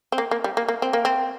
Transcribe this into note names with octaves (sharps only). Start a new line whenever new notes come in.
C4
A#3
A#3
G3
A#3
A#3
C4
A#3
C4